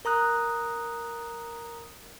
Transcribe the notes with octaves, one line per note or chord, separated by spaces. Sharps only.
A#4 A#5 D#6 F#6